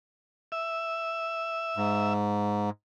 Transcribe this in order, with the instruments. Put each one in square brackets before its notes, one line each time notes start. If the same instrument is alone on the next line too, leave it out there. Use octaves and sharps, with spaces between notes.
[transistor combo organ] E5
[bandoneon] G#2